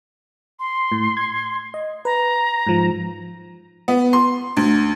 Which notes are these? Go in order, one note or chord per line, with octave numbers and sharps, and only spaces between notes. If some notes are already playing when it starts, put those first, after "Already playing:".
C6
A2
G#6
D#5
B4 A#5
G#2 F3
B3
C6
D2